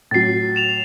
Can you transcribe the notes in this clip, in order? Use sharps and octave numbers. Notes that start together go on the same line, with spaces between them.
A2 F#3 A6 C7
C7 E7 F7